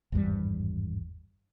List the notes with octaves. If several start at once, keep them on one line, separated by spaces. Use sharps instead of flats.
G#1 E2 G2 G3